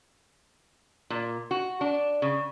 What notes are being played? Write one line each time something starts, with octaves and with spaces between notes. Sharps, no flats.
A#2
F#4
D4
C#3